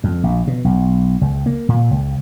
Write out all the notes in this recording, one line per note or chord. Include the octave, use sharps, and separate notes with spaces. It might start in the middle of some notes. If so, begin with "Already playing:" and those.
F2
A#1
B2
B1
C#2
A#3
A#2
C#2